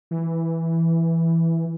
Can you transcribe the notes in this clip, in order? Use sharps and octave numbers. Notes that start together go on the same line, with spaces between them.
E3